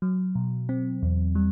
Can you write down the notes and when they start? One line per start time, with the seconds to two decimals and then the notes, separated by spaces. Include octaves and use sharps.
0.02 F#3
0.35 B2
0.69 C4
1.03 E2
1.35 G3